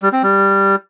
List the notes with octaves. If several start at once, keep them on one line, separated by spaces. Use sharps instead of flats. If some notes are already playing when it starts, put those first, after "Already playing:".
G3
C4
G3